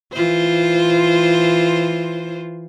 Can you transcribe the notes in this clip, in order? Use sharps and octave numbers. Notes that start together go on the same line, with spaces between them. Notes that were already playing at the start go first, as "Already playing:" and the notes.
E3 F4 C5